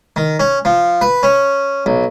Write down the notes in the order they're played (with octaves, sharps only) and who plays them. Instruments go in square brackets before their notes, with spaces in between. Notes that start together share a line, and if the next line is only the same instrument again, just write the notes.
[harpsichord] D#3
C#4
F3
B4
C#4
B1